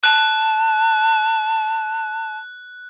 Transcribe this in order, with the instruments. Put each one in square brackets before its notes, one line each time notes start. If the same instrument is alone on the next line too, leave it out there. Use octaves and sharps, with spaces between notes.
[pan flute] A5 [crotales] F#6